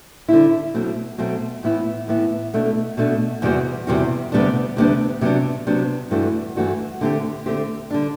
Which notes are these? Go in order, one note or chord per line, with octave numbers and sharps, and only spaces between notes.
D3 G3 C4 E4
B2 F#3 A3 C4
B2 F#3 A3 C4
A2 E3 B3 E4
A2 E3 B3 E4
B2 A3 D4
B2 A3 D4
E2 C3 G3 C4 F#4
E2 C3 G3 C4 F#4
D2 C3 G3 B3 D4
D2 C3 G3 B3 D4
C3 F#3 B3 D4
C3 F#3 B3 D4
G2 E3 A3 D4 F#4
G2 E3 A3 D4 F#4
D3 A3 C4 G4
D3 A3 C4 G4
D3 G3 D4